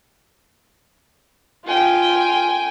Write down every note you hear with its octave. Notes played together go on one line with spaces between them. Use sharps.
F4 G5 G#5